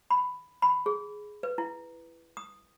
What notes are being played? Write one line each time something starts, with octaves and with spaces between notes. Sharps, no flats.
B5
B5
G#4
B4
E4
D#6